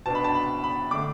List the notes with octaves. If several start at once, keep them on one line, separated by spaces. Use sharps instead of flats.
B2 B3 D4 A5
B5
A5
B5
B5
D3 A3 D4 D6